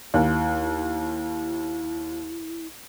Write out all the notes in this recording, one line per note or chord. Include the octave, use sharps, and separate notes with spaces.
D#2 E4